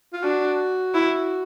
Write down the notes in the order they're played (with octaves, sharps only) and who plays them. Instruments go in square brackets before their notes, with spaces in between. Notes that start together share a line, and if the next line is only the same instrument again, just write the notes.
[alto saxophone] F4
[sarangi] D4 [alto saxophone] F#4
[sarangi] E4